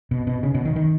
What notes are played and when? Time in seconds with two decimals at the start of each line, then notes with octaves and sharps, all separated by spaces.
0.11 B2
0.27 B2
0.43 C#3
0.55 B2
0.65 D#3
0.76 D#3